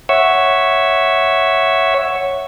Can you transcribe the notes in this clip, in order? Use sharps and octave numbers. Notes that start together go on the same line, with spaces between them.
C#5 E5 F#5 C#6 E6